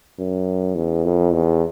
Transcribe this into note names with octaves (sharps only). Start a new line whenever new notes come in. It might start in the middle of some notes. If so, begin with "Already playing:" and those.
F#2
E2
F2
E2